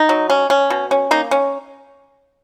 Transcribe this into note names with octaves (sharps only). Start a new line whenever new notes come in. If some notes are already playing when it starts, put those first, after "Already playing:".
Already playing: D#4
F#3
C#4
C#4
B2
C#4
A#3 D#4
C#4